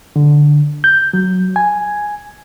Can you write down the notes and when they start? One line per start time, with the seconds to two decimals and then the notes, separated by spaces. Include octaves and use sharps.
0.16 D3
0.84 G6
1.13 F#3
1.56 G#5